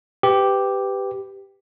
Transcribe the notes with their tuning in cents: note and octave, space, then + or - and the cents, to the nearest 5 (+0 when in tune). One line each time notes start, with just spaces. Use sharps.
G4 +0 B4 +20